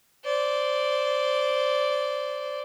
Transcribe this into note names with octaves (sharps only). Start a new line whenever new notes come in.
C5 D5